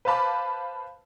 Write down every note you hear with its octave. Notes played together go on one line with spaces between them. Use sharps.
B4 C5 F5 A5 B5 D6